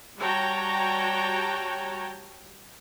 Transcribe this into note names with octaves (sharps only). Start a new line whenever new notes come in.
G3 F#4 C#5 G5 A5 A#5